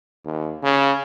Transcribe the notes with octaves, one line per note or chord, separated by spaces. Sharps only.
D#2
C#3